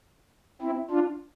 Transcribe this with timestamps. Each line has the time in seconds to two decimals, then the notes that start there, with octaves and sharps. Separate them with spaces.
0.61 C4 E4
0.91 D4 F4